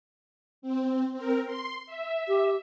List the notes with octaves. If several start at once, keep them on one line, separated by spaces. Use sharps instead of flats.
C4
C4 A#4
C6
E5
G4